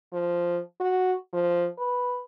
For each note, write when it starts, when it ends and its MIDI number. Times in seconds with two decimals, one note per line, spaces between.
0.13 0.59 53
0.80 1.14 66
1.33 1.67 53
1.78 2.22 71